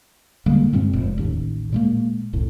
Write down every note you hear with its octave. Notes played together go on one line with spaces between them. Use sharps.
D3 G3 G#3 A#3
G2 A#2 G#3 C4
F1
A1 D#2
A#2 G#3 A#3
E1 C2 A2